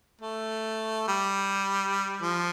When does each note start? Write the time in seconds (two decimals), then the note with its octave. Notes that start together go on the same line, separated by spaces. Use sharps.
0.21 A3
1.08 G3
2.22 F3